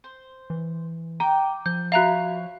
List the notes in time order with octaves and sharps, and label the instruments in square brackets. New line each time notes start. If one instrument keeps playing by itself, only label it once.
[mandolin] C5
[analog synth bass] E3
[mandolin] G5 D6 [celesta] A#5
[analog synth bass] F3 [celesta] G6
[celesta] F#4 E5 [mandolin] C#5 [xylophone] F5 A#5 F#6